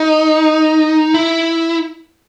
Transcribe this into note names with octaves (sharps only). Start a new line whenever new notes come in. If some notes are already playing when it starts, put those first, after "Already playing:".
Already playing: D#4
E4